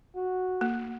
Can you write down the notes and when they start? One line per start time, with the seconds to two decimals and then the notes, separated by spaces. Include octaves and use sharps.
0.15 F#4
0.61 A#3